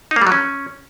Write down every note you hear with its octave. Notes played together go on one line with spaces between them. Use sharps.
D#4
A#3
G3
F#3
C#4